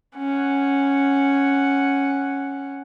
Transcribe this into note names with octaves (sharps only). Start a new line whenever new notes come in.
C#4 F#5